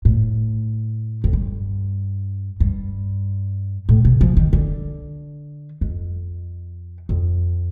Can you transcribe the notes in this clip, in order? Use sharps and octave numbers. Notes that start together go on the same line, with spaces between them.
A2
F2
G2
G2
A2
C3
F3
D#3
D3
F2
F2